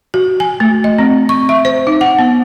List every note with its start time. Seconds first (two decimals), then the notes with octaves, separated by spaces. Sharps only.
0.14 F#4
0.40 G#5
0.60 A3
0.84 D#5
0.98 C4
1.29 C#6
1.49 E5
1.65 C5
1.87 D#4
2.01 F#5
2.18 B3